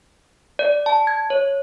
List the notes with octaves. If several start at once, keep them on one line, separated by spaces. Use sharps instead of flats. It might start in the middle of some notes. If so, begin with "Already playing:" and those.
D5
A5
G#6
C#5